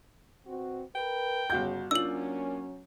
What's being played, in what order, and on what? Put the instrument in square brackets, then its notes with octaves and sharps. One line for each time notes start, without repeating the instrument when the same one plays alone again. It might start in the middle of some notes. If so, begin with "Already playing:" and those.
[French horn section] B2 C4 F#4
[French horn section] A#4 B4 [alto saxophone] G5
[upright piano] G1 F#4 G6 [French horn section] C#3
[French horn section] F#3 C#4 [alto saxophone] A#3 [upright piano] D4 F4 [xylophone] E6 F#7